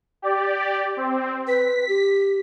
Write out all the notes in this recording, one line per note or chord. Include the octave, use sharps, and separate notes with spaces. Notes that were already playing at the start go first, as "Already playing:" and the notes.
G4 D5
C4
B4 B6
G4